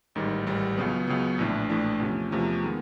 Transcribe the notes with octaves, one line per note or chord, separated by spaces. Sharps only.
A1 G#2 D#3 G3
A1 G#2 D#3 G3
C#2 C#3 F#3 B3
C#2 C#3 F#3 B3
A#1 A2 E3 A3 D4
A#1 A2 E3 A3 D4
E2 C3 F3 A3 C#4
E2 C3 F3 A3 C#4
D#3 G#3 B3